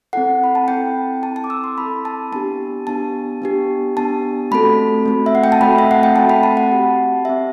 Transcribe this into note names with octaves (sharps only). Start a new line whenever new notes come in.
C4 E4 A4 F#5
B5
A5
C4 E4 A4 G5
C4 E4 A4 A5
A5
D6
E6
C6
C4 E4 A4 B5
A5
B3 D4 G4 A5
B3 D4 G4 A5
B3 D4 G4
B3 D4 G4 A5
A3 C4 F#4 A4 B5
A3 C4 F#4 A4
E5
F#5
G5
A5
A3 C4 F#4 A4 B5
E5
F#5
G5
A3 C4 F#4 A4 A5
B5
A5
F#5
C4 G4
C4 G4 E5